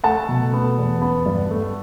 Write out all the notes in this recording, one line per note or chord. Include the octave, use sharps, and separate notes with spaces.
A3 F#5 A5
B2
B3
E2
B3
G2
A3